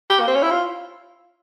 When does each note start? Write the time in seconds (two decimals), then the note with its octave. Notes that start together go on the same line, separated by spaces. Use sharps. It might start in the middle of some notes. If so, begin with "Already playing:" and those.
0.10 G4
0.20 A#3
0.28 C4
0.35 C#4
0.43 E4
0.51 F4